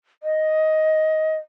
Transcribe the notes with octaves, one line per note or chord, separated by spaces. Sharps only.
D#5